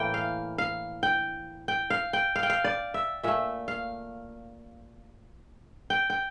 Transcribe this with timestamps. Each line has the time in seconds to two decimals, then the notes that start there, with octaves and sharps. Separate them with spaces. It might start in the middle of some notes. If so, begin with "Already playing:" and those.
Already playing: A2 E3 A#3 G5
0.14 F5
0.58 F5
1.03 G5
1.68 G5
1.90 F5
2.13 G5
2.36 F5
2.43 G5
2.50 F5
2.64 D5
2.94 E5
3.23 A#2 A3 E5
3.68 F5
5.90 G5
6.10 G5